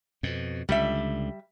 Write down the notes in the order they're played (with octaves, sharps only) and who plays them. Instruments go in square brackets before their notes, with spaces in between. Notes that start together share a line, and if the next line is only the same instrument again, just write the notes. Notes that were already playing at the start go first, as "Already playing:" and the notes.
[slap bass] F2 B2
[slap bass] C#2 D3 [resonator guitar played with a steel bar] G3 E5